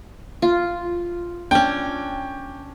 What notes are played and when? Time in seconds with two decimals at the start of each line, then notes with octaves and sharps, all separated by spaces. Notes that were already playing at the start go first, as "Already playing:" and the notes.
0.42 F4
1.51 C#4 D4 G5